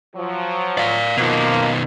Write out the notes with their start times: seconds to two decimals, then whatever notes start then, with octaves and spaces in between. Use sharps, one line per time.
0.16 F3 F#3
0.78 D5 F5
1.17 B2 D#3 F3 A#3